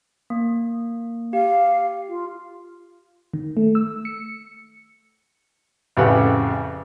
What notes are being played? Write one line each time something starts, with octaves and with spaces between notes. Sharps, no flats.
A#3
G4 F5
F4
D#3
A3
E6
C#7
A1 F2 C#3 G4 B4 F#5